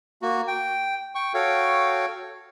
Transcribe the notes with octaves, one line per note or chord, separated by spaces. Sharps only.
A#3 F#4
G5
G5 C#6
F#4 A4 C#5 F5 G5